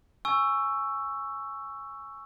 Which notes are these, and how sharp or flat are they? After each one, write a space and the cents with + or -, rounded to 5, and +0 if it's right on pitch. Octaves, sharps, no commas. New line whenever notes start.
G#5 +0 C#6 +0 E6 +10